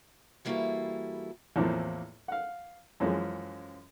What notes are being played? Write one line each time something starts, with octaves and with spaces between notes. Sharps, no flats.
E3 G3 A#3 E4 F#4 A4
E2 A2 E3 F3 A#3 C4
F5 F#5
F#2 E3 F3 G#3 C#4